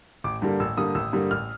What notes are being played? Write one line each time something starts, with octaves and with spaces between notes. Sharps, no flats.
A1 D6
G2 D3 G3 A#3
A1 E6
G2 D3 G3 A#3 D#6
A1 E6
G2 D3 G3 A#3
A1 F6